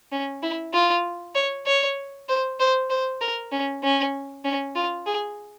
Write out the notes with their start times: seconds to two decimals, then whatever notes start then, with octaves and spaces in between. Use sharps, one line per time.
0.12 C#4
0.43 E4
0.74 F4
1.35 C#5
1.66 C#5
2.29 C5
2.60 C5
2.90 C5
3.21 A#4
3.52 C#4
3.83 C#4
4.45 C#4
4.75 F4
5.06 G#4